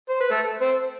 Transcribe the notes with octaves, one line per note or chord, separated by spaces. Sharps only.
C5
B4
A3 A4
C4 C5